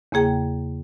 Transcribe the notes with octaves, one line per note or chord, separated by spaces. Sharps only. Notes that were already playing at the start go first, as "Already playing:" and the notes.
E2 C#3 A#3 G#4 G5